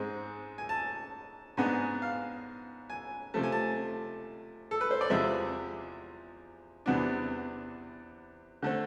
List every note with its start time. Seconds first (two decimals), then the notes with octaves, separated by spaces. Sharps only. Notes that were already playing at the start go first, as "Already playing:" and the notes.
Already playing: G#2 G#3 C4
0.58 G#5
0.69 A5
1.57 G#2 G#3 B3 D4 G#5
2.02 F5
2.90 G#5
3.34 C3 F3 A3 A5
3.43 G#5
3.52 A5
4.71 A4
4.81 B4
4.91 C5
5.01 D5
5.10 E2 C3 F3 G#3 E5
6.86 E2 C3 E3 B3 D4
8.63 D3 A3 C4